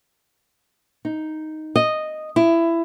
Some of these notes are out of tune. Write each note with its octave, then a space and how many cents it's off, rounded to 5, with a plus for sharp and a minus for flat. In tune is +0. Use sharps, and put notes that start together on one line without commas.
D#4 +0
D#5 -5
E4 +20